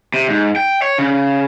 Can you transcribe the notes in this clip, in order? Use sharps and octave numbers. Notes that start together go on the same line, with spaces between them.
C3
G#2
G5
C#5
C#3